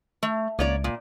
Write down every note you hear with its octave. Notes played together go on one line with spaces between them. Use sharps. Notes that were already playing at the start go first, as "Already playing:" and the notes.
A3
C#2 A#3 C#5 D5
A#2